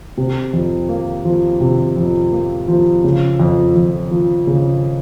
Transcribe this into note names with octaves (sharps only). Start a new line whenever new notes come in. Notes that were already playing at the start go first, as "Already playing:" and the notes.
C3
F2
A#3
F3
C3
F2
A#3
F3
C#3
F2
F2
F3
C#3